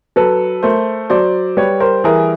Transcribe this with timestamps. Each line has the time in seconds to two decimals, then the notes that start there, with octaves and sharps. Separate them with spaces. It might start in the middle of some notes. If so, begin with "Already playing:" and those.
0.16 F#3 A4 B4
0.63 A3 A#4 C5
1.10 F#3 C5 D5
1.57 G3 B4 C#5
1.80 A#4 C5
2.04 E3 G#4 A#4